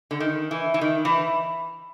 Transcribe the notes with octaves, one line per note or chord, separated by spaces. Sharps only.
D3
D#3
E3
E3
D#3
E3